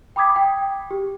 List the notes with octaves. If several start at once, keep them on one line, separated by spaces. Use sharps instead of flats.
G5 B5 D6 D#6 G#6 B6
G5
G4